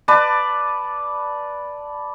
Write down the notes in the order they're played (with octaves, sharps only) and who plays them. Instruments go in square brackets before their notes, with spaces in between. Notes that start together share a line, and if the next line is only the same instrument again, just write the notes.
[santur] B4 D5 A5